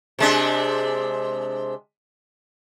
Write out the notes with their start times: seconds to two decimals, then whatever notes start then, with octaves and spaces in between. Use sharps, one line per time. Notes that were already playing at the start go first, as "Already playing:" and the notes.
0.19 C3 G#3 D4